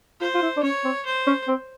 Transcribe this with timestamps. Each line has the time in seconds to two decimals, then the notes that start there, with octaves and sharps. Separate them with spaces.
0.21 F4 C5
0.35 F4
0.42 E4
0.57 D4
0.63 C#4 C#5
0.85 C4
1.06 C5
1.27 C#4
1.48 C4